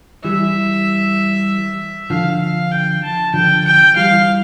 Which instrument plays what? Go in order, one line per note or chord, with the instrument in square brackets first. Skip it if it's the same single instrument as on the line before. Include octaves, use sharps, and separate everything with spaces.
[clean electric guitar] E3 G3 [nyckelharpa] E5
[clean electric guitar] D3 F3 [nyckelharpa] F5
[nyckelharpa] F5
G5
A5
[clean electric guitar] D3 F3 [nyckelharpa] G5
[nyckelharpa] G5
[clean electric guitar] E3 G3 [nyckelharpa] F5